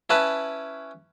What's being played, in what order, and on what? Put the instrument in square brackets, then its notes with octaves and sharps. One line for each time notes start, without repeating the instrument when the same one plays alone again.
[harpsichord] C#4 E4 B4 A5 B5